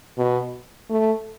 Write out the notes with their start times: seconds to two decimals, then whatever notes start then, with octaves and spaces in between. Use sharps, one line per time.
0.18 B2
0.90 A3